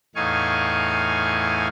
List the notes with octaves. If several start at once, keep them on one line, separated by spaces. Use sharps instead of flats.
E2 A2 D#4 F5 G#5 C#6